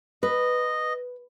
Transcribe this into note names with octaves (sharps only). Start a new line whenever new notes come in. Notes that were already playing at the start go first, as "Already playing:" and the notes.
B4 D#5